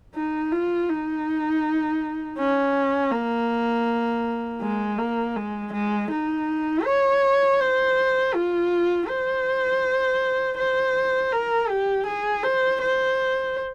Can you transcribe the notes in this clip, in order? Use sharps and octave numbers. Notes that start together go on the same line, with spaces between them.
D#4
F4
D#4
C#4
A#3
G#3
A#3
G#3
G#3
D#4
C#5
C5
F4
C5
C5
A#4
G4
G#4
C5
C5